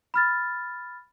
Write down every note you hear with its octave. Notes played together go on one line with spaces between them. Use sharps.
B5 F6 A6